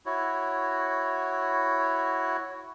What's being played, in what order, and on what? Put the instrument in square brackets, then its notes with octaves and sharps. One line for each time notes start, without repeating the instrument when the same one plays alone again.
[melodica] E4 F#4 C#5